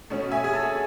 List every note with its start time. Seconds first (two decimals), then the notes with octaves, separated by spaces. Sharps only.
0.10 B2 A3 C#4
0.32 E5 G#5
0.44 G#4
0.53 A4